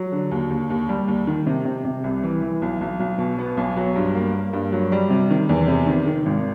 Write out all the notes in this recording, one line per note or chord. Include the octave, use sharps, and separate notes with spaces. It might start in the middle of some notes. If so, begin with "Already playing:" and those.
Already playing: F#3
D3
D#2
D#2
D#2
G3
D#2
D#3
C3
C3
C3
C2
E3
E3
B1
B1
B1
B2
B3
B1
F#3
G2
A#3
A#3
G2
F#3
G3
C3
D#3
E2
C3
D#3
D#3
G#1